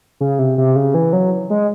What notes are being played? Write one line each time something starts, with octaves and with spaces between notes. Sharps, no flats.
C#3
C3
C3
C#3
E3
F#3
G#3